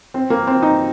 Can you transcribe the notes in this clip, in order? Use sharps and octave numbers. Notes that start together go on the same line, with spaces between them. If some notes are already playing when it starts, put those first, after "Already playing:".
C4
A#3
C4
D#4